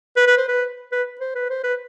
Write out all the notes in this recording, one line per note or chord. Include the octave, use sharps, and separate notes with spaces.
B4
B4
C5
B4
B4
C5
B4
C5
B4